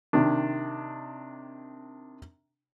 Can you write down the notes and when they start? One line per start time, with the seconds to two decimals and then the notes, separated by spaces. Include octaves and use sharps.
0.13 C3 D#3 D4